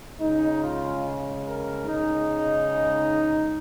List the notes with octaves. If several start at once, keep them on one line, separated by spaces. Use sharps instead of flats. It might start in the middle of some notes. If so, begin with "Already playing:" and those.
C#3 G#3 D#4
F4
A#4
C#3 G#3 D#4